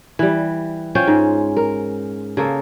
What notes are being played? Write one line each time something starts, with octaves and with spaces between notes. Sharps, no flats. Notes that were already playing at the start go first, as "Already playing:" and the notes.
E3 G3
C#4 F4 C5 G5
G#2
A#4
C#3 A#3 A4